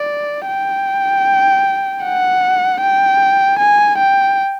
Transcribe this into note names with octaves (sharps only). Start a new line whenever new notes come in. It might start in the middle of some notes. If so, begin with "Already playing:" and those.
Already playing: D5
G5
F#5
G5
G#5
G5